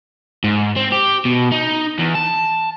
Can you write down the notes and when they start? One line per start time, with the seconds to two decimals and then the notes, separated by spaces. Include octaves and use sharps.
0.44 G#2
0.76 C4
0.92 G4
1.25 B2
1.52 D#4
1.99 E2
2.15 A5